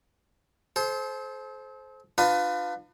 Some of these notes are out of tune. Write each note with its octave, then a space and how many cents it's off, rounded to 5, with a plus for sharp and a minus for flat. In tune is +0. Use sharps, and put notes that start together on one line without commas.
A4 -45 C5 +0
D4 +45 F4 +20 B4 +25